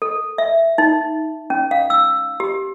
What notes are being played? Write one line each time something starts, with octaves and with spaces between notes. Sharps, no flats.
A4
E5
D#4
C#4
F5
E6
G4